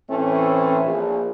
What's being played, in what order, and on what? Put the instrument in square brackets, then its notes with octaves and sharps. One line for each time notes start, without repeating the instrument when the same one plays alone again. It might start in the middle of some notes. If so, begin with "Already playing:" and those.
[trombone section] A2 E3 A3 C4 C#4
A#1